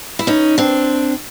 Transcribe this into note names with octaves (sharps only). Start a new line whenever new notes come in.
E4
C#4 D#4
C4 D4